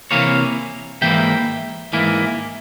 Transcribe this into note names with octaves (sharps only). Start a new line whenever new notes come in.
C3 E3 A#3 C#5 F5
G#2 E3 A#3 E4 E5 G5
G#2 E3 A#3 E4